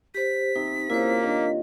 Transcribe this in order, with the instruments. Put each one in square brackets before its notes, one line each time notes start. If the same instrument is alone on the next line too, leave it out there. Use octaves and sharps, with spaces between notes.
[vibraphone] G4 C5 [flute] B6
[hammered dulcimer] C3 [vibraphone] D#4
[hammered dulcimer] A#2 C#3 [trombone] A#3 [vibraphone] E4 C5
[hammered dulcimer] D#3 [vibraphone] D4